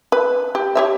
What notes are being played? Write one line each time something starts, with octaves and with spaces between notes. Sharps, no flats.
B4
G4
G4 C#5 E5